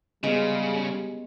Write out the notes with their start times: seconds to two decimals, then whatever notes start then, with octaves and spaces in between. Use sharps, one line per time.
0.23 C#3 G3 G#3 B3 C#4